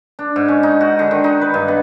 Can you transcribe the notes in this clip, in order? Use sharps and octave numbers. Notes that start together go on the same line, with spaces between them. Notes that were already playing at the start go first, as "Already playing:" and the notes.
D4
G#2
C#4
D#4
F#4
D3
D#3
D#4
B4
G2
B3